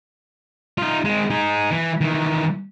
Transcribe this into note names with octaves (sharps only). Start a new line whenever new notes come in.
D#4 F4
G#3 C4
D#4 G#4
E3
D#3 E3